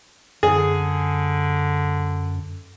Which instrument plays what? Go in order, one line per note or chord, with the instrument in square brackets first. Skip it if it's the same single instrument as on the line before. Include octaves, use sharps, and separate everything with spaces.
[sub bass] F#2 [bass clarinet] D3 [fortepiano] G#4